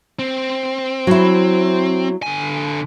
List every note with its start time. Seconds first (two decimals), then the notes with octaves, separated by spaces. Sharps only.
0.19 C4
1.07 F#3 E4
2.23 D3 G#5